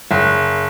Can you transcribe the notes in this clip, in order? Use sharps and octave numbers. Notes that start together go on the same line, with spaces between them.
F#1